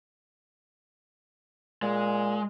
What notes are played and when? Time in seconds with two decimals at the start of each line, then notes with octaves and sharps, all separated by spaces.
1.82 A#2 G#3